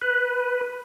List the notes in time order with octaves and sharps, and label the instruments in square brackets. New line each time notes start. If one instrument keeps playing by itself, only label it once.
[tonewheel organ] B4